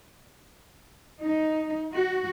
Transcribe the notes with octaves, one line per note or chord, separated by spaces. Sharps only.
D#4
F#4